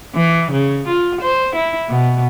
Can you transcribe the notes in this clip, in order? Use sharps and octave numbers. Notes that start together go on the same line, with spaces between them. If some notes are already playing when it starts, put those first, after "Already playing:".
E3
C#3
F4
C5
E4
B2